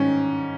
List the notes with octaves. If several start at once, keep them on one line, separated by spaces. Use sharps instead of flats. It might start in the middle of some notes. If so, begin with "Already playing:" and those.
Already playing: G#2 D#3 C#4